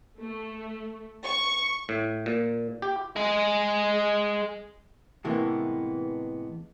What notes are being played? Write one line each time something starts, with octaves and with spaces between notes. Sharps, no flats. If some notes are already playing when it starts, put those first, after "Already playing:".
A3
C#6
A2
A#2
G4
G#3 G#4
A2 C3 E3 G#3 A#3 B3